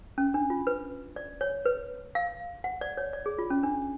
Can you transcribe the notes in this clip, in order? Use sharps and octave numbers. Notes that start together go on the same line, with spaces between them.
C#4
D4
F4
B4
D5
C#5
B4
F5
F#5
D5
C#5
D5
G#4
F4
C#4
D4